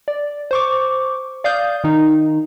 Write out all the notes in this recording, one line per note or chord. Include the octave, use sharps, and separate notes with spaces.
D5
C5 C#6 D6
D5 F5 D#6 G6
D#3 D#4